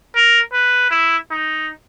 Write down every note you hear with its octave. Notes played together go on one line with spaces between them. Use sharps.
A#4
B4
E4
D#4